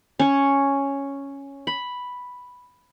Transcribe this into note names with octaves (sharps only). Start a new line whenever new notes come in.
C#4 C#5
B5